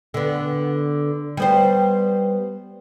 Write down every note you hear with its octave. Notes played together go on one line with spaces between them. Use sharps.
D3 B3
G3 B3 C5